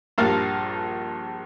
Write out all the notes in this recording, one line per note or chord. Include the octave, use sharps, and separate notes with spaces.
A#1 G2 A#3 F5 A5